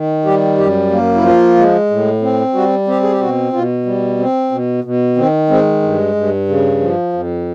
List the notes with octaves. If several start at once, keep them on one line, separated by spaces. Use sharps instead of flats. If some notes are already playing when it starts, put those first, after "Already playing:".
Already playing: D#3
G3 G4
F#2 G4
A#3
E4
F3 F4
G#3
A2
C4
G3 F#4
C4 G4
G#4
G4
B2 F#4
B2 F4
G3
C4
B2
B2
D#3 C4
G#3 C4
G2
G2
C#3
F3
F2